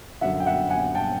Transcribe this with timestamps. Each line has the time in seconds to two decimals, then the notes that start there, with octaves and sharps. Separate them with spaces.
0.21 F#2 D3 E5 F#5
0.40 G5
0.46 E5 F#5
0.70 F#5 G#5
0.95 G5 A5